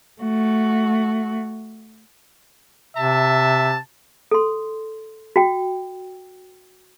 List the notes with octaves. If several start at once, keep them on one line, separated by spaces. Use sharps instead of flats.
A3 F#4
C3 E5 A5
A4 C6
F#4 G5